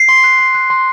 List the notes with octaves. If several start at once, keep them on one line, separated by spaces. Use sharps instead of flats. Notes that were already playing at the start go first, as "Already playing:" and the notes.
Already playing: C7
C6
F#6
C6
F#6
C6